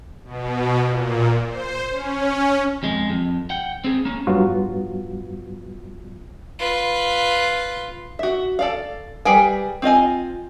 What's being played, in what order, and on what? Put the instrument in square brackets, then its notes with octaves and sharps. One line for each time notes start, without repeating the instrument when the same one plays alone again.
[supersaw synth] B2
A#2
C5
C#4
[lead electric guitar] F2 G#3
F2
F#5 G5
C4 G#4
A#3 C#4
[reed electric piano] G2 F#3 B3 F4 F#4
[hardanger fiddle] F4 B4
[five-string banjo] F#4 E5
A4 D5 F5
G3 G#4 B4 G5 G#5
C4 F4 D#5 G#5